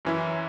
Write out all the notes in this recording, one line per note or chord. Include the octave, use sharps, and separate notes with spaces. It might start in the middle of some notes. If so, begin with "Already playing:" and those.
F#2 E3 C#4 E4